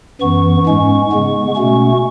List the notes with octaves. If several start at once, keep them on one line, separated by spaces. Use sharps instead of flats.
F#2 E3 B3 C#6
G#2 G#3 C#4
C#3 G#3 B3
B2 A3 C#4 C#6